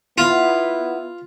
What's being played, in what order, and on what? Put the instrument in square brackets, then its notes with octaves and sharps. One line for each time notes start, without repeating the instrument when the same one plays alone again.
[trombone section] B3 E4 [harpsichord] F4